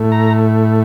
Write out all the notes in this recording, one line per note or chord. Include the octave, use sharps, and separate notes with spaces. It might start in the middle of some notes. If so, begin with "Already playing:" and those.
Already playing: A2 A3
A#5